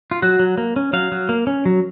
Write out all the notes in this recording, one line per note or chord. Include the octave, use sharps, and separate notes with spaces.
F4
F#3 F#4
F#3
A#3
C#4
F#3 F5
F#3
A#3
C#4
F#3